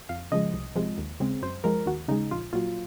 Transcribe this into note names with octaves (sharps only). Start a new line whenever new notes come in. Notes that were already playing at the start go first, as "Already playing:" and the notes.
F2 F5
C#3 F3 G#3 D#5
C2
C3 F3 G#3
D#2
C#3 G#3 C4
F#2 C5
F3 G#3 A#4
D#2 F#4
C#3 G#3 D#4
A#1 F4
A#2 F#3 F4